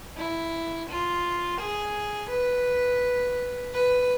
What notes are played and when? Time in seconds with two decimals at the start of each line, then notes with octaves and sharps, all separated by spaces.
0.17 E4
0.89 F4
1.60 G#4
2.30 B4
3.73 B4